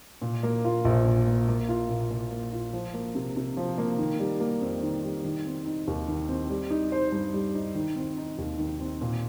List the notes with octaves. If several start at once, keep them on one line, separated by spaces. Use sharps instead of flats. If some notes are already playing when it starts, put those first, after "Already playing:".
A#2
A#3
F4
A#1
A#2
A#3
A#3
F4
A#2
A#2
A#3
F4
F3
A#3
C3
C3
F3
A#3
D#3
G3
A#3
F2
D#3
G3
D#3
C4
D#4
D#2
D#3
C4
G3
D#4
C5
G2
G3
D#4
D#3
C4
D#4
D#2
D#3
C4
A#2